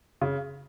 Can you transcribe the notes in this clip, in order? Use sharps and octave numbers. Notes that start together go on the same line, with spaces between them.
C#3